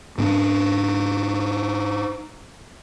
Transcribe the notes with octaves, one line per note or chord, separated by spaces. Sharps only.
G#2 C4 D4